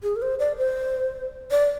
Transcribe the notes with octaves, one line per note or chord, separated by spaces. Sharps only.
G#4
A#4
C5
D5
C5
D5